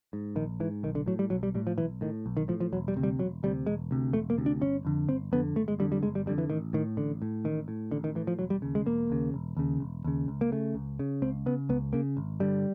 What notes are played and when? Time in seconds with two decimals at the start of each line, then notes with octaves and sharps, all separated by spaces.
0.13 G#2
0.36 A#1 D#3
0.60 G#2 E3
0.83 B1 D#3
0.95 D3
1.06 A2 F#3
1.19 G3
1.30 B1 F#3
1.43 G3
1.55 A2 G3
1.67 F3
1.78 B1 E3
2.01 A2 D#3
2.26 B1
2.37 D#3
2.48 A2 F3
2.60 F3
2.72 E1 F#3
2.88 G3
2.96 D2 C3
3.03 G3
3.19 E1 F#3
3.43 D2 C3 G3
3.66 E1 G#3
3.91 D2 C3
4.13 E1 A3
4.30 A#3
4.38 D2 C3
4.46 D4
4.61 G1 C#4
4.85 F2 D3
5.09 G1 C4
5.32 F2 D3 B3
5.56 G1 A3
5.68 G#3
5.79 F2 D3 G3
5.92 G3
6.03 G1 G#3
6.15 G3
6.26 F2 D3 G3
6.38 E3
6.50 A1 D#3
6.73 A2 D#3
6.97 A1 D3
7.22 A2
7.44 A1 D#3
7.68 A2
7.91 A1 D3
8.04 D#3
8.15 A2 E3
8.27 F3
8.39 E1 F#3
8.50 G3
8.62 D#2 C#3
8.75 G#3
8.86 E1 A#3
9.10 D#2 C#3
9.34 E1
9.57 D#2 C#3
9.80 E1
10.04 D#2 C#3
10.28 C#2
10.41 A#3
10.52 C#3 A3
10.75 C#2
10.99 C#3
11.22 C#2 C4
11.46 C#3 B3
11.69 C#2 B3
11.93 C#3 A#3
12.17 G#1
12.40 G2 D3 G3